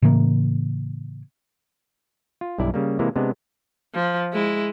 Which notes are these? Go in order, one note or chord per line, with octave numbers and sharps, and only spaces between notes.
A2 C#3 E3 A#3
F4
B1 G2 E4 D5
C#3 G3 A#3
C3 E3 G#3 A#3 E4
C3 G#3 B3 D4
F3
G#3 E4